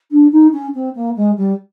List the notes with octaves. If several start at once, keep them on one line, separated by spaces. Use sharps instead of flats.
D4
D#4
C#4
C4
A#3
G#3
G3